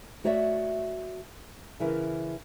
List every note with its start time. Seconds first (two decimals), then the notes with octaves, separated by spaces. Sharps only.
0.24 A3 F#4 C#5 D5 E5
1.80 C#3 E3 C#4 E4 A#4